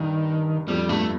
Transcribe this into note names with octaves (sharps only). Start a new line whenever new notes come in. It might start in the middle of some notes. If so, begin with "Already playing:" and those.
Already playing: G2 D#3
F2 G3
G2 A3